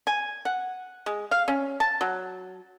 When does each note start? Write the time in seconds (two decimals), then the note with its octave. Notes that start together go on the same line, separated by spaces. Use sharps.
0.07 G#5
0.45 F#5
1.06 G#3
1.31 F5
1.48 C#4
1.80 A5
2.01 F#3